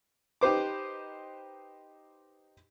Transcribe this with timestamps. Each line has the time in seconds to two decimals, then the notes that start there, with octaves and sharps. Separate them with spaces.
0.41 D#4 G4 B4 C5 D6